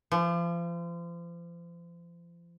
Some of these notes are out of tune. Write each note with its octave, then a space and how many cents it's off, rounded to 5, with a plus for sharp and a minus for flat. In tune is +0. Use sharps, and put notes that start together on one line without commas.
F3 -35